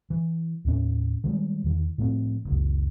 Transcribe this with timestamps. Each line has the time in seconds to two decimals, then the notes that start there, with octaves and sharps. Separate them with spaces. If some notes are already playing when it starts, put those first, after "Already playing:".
0.10 E3
0.65 D#2 A2 C#4
1.24 D#3 E3 G3 G#3
1.64 E2 D#3
1.98 A2 F3 A3 C4
2.45 F#1 C#2